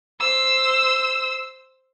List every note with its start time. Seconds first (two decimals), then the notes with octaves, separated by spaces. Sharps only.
0.20 C5 E6